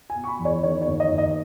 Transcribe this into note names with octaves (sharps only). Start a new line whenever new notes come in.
G#5
B2
C#6
B5
E2
C#5
D#3 C#5
C#5
D#2
D#5
D#2
D#5